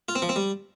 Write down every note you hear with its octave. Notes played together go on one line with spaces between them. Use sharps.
F4
C4
F3
C4
G3